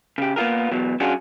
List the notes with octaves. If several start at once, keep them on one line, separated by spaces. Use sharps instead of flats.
C#3 G4
A#3 B3 F4 G#4 A#4
E2 B2 F#3
F#3 C#4 D4 F4 F#4 G#4